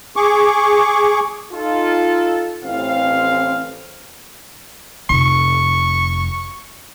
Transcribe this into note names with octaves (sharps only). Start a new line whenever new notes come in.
G#4 C#6 D6
D#4 F4 A4
A1 C4 F5
F1 C#6